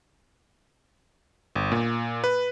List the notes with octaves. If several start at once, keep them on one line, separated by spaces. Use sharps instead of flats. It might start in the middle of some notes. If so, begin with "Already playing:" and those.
G1
A#2
B4